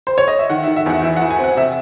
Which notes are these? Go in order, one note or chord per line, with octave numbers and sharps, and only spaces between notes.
C5
C#5
D#5
E5
D#3 F#5
D#3 E5
E5
E2 F#5
E3 E5
E3 F#5
G#5
C4
F#5
C3 E5